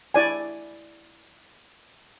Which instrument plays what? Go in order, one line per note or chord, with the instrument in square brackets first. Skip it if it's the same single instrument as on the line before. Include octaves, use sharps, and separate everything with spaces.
[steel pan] E4 D5 G#5